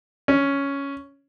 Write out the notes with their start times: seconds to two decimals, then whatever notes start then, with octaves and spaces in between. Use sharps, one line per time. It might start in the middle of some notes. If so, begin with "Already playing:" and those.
0.28 C#4